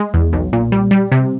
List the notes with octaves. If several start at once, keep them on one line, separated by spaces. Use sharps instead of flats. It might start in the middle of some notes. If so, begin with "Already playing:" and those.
Already playing: G#3
E2
B1
A#2
G3
G3
C3